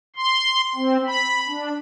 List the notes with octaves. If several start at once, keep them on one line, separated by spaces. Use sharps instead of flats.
C6
C4
B5
D4